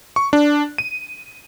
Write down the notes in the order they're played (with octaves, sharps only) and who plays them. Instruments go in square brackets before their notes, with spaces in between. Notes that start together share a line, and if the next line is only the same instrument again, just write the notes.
[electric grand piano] C#6
D4
D#7